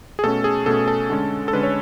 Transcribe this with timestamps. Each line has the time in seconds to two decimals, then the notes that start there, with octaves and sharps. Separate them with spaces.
0.19 G#4
0.23 B2 A3 C#4 A4
0.44 G#4
0.66 B2 A3 C#4 A4
0.88 A4
1.10 D3 G#3 C#4
1.48 A4
1.53 D3 G#3 C#4 B4
1.63 C#5